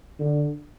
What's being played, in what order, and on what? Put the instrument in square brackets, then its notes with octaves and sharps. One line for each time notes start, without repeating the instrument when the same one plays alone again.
[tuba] D3